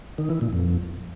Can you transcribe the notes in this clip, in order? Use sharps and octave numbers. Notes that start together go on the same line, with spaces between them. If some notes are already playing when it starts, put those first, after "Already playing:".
D#3
E3
A#2
F2